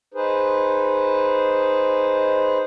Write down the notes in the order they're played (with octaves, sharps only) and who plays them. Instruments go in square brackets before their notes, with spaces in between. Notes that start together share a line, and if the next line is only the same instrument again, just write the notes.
[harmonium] D#4 G#4 B4 C5